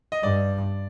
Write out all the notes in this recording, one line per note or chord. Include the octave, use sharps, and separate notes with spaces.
D#5
G2 D5